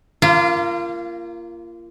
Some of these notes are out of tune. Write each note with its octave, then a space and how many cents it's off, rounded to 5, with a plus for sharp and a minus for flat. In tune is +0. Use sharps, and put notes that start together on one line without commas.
A#3 +0 F4 -30